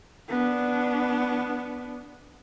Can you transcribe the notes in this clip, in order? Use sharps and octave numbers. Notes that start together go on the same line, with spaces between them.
B3 D4